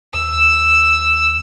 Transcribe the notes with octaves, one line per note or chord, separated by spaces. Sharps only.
D#2 E6